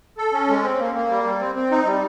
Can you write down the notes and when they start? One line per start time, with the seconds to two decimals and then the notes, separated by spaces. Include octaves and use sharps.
0.18 A4
0.33 C#4
0.49 G#3
0.63 C4
0.79 A#3
0.95 A#3
1.10 G3
1.24 G3
1.40 C4
1.55 C4
1.71 D#4
1.86 G3